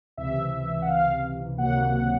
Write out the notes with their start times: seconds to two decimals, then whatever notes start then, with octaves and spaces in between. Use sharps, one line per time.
0.17 C#2 C3 E3 E5
0.82 F#5
0.88 F5
1.58 C#2 C3 D#3 F#3 A#3 F#5